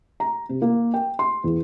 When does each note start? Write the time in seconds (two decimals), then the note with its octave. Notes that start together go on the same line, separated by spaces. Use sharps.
0.20 A#5
0.49 C3
0.62 A#3
0.94 G5
1.19 C6
1.44 E2